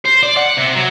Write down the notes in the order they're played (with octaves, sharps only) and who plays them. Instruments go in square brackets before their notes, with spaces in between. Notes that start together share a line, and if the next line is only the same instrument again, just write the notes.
[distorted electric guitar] C5
D5
F#5
C3
F#3